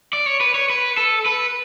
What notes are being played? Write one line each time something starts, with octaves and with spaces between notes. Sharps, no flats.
D5
C#5
B4
C#5
B4
A4
B4